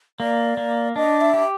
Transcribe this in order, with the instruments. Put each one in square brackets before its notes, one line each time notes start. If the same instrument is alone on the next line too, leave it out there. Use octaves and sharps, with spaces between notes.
[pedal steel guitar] A#3 [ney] D5
[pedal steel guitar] A#3
[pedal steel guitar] D4 [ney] D#5
[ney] E5
[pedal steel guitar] G4